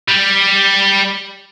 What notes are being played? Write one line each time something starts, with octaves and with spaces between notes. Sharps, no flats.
G3